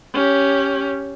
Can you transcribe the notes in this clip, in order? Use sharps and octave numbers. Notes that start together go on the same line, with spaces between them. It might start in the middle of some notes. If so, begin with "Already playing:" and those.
C#4 G4